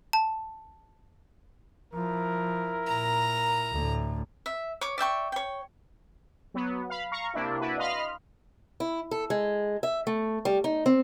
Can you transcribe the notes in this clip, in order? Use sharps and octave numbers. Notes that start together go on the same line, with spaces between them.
A5
F3 E4 A#4
A#2 A#5
D2 A2
E5
C#5 D6
D5 E5 G5 C#6
C#5 G5
F#3 B3
F5 B5
F5 A#5 C#6
C3 A#3 D4 E4
D4 E4 F#4 B4
D#5 F5 B5 C6 F6
E4
A4
G#3
E5
A3
G3
D#4
C4